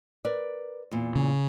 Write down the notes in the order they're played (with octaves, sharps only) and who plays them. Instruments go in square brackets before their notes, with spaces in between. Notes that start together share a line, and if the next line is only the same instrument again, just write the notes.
[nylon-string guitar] A#4 B4 D5
E2 A#2
[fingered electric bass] C#3